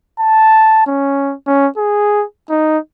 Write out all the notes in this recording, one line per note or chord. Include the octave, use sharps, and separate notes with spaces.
A5
C#4
C#4
G#4
D#4